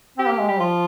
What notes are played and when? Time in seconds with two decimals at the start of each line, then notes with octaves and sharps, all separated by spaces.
0.18 C4 G4
0.29 A#3
0.40 G#3
0.49 G3 G4
0.60 F3 F4